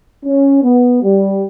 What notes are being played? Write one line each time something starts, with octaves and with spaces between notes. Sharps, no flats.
C#4
B3
G3